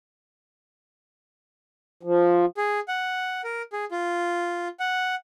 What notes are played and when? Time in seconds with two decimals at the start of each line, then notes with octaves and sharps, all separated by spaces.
2.03 F3
2.57 G#4
2.88 F#5
3.44 A#4
3.73 G#4
3.92 F4
4.80 F#5